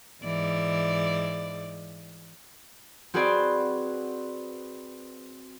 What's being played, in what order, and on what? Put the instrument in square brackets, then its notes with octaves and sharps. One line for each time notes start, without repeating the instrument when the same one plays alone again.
[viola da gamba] G#2 E3 D5
[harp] C4 F#4 G#4 B4 C5 D5